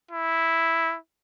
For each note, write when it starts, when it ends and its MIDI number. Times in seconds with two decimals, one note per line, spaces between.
0.11 0.96 64